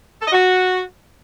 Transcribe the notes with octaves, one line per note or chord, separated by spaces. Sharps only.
A4
D#5
F#4